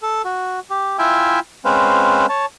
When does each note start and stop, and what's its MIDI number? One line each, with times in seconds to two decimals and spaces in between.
0.03 0.22 69
0.25 0.60 66
0.70 0.97 67
0.99 1.40 64
0.99 1.40 65
0.99 1.40 76
0.99 1.40 79
0.99 1.40 80
1.65 2.26 56
1.65 2.26 60
1.65 2.26 61
1.65 2.26 71
1.65 2.26 72
1.65 2.26 77
2.29 2.46 73
2.29 2.46 81